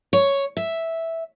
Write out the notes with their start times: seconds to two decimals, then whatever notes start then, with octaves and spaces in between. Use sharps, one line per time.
0.13 C#5
0.57 E5